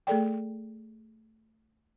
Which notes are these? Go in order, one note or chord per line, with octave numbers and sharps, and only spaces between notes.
A3 G#4 A4 D5 G5